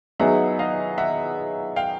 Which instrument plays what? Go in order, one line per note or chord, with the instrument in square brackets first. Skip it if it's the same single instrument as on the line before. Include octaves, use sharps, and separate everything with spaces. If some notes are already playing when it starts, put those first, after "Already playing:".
[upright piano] F#3 B3 D#4 G#4 [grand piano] E5 F#5
[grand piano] D#5 F5
E5 F#5
F5 G5